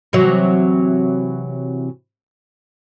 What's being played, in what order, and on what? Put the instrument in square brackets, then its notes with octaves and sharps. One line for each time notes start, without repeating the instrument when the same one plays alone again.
[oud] C3 E3 F#3